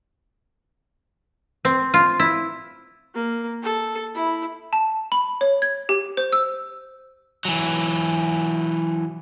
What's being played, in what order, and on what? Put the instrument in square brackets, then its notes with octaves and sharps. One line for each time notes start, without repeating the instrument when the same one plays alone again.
[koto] C4
F4
E4
[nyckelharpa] A#3
A4
E4
[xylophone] A5
B5
C#5
G#6
G4
C5
E6
[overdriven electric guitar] E3 F#3